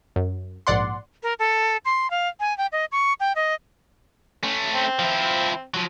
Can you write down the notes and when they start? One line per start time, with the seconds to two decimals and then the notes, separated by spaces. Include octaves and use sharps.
0.16 F#2
0.67 A#1 G#2 D5 F#5 C6
1.23 A#4
1.39 A4
1.85 C6
2.10 F5
2.40 G#5
2.58 G5
2.72 D#5
2.92 C#6
3.20 G5
3.36 D#5
4.44 A3 C#4
4.73 C4
4.99 F3 E4
5.74 F3 F#3